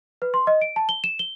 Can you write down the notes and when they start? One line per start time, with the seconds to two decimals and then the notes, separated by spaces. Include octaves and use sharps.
0.22 B4
0.34 C6
0.47 D#5
0.62 D7
0.76 A5
0.89 G7
1.04 E7
1.19 G7